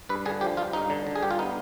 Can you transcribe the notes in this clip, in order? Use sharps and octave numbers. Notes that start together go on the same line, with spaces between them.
G2 B4
D3 G#4
F3 G4
G2 F4
G2 D#4
D3
D3
G#4
G2 G4
F4
B3 D#4